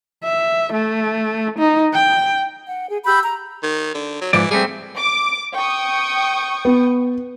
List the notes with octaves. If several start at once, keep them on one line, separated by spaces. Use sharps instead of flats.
E5
A3
D#4
G5
F#5
G#4
G4 B5 E6 G6
A#5
D#3
D3
F#3
G#2 E3 F3 D5
G3 A3 C4 G#4
D6
G5 C#6 D#6
B3